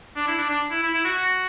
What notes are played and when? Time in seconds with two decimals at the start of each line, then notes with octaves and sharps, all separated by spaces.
0.16 D4
0.27 E4
0.38 D4
0.49 D4
0.71 E4
0.82 E4
0.94 E4
1.05 F#4